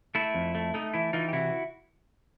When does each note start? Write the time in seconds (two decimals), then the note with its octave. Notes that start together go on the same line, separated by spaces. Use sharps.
0.15 A3 E4
0.35 F2
0.55 A3
0.74 A3 D#4
0.94 E3 E4
1.13 E3 D#4 F4
1.28 G4
1.33 C3 E4 F#4